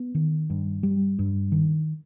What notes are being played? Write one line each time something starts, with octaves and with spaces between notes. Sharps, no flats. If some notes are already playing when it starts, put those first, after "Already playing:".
Already playing: B3
D#3
G2
G3
G2
D#3